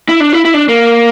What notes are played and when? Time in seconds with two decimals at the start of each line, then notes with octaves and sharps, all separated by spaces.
0.09 E4
0.20 D4
0.33 E4
0.45 E4
0.54 D4
0.68 A#3